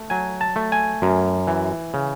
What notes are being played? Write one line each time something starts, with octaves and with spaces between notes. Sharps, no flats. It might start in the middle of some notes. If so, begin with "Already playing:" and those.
Already playing: A3
F#3 G#5
A5
A3
G#5
F#2
E3
C#3